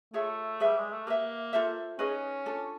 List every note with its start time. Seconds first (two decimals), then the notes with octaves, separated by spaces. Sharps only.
0.13 A3 F4 G#4 C#5 E5
0.60 G3 G#4 B4 E5
0.78 G#3
0.93 A3
1.06 A#3 G4 B4 E5
1.53 F4 A4 C5 E5
1.99 C#4 D#4 G#4 B4 D#5
2.46 D4 F4 A4